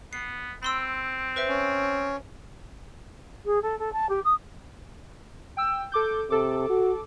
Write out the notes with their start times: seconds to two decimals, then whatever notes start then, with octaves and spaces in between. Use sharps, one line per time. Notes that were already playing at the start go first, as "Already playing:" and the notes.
0.13 B3 C7
0.63 C4 B5 C6 E6
1.36 B4 C5 E5
1.48 C#4
3.45 G#4
3.62 A4
3.78 A4
3.92 A5
4.09 G4
4.24 D#6
5.57 G5 E6
5.92 A4 D6 G6
6.30 C3 A4 D6
6.69 F#4